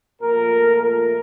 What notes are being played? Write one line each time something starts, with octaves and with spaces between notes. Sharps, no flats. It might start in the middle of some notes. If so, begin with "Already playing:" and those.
A#2 F3 A3 A#4
A#4